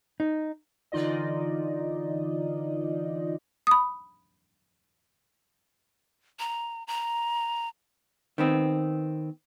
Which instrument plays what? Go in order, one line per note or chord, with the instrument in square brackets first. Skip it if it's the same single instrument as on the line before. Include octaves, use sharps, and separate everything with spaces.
[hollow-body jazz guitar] D#4
[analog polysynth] D3 E3 D#4 F4 D5 D#5
[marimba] B5 D#6
[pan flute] A#5
A#5
[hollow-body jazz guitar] D#3 B3 C4